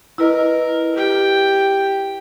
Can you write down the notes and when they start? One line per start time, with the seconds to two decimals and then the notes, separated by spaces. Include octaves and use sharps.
0.18 E4 A#4 B4 D#5
0.94 G4 G5